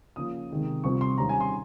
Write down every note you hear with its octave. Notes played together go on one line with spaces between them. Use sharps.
C#3 F3 A#3 D#6
C3 D#3 G#3 D#4
C2 C3 F3 C4 F4 C#6
C6
D#2 C#3 G3 C4 A#5
G#5
C6